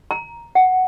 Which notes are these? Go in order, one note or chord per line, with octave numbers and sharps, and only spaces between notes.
A#5
F#5